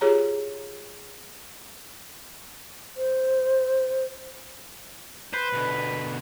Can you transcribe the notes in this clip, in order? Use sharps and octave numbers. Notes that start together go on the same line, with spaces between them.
F4 G4 G#4 C#5 A#5
C5
B4 C5
B2 D3